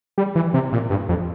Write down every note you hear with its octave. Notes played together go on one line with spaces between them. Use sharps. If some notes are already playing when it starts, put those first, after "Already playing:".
G3
E3
C3
A#2
G2
F2